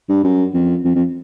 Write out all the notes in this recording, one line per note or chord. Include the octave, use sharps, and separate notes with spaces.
G2
F#2
F2
F2
F2